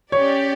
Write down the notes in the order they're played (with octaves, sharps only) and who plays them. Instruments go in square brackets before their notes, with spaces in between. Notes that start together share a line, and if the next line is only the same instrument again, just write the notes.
[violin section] C#4 G4 D5 [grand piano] C#5